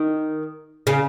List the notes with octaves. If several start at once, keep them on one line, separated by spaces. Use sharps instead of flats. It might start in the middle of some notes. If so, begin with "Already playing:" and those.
Already playing: D#3
C#3